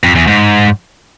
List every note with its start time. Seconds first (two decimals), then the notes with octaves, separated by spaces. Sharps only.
0.04 F2
0.16 E2
0.27 G#2